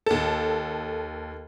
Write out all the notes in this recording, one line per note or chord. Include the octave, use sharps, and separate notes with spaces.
D#2 A4